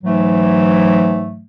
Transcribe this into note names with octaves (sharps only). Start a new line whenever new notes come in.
G#2 E3 F#3 A3